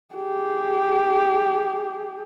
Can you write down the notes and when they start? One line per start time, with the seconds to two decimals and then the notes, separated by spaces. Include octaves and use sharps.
0.14 G4 G#4